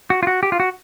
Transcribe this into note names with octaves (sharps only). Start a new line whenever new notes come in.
F#4
F4
F#4
G4
F4
F#4